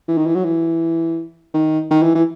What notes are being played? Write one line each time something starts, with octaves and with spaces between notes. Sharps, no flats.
E3
D#3
E3
F#3
E3
D#3
D#3
E3
E3